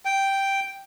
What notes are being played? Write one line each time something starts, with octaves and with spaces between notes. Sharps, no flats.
G5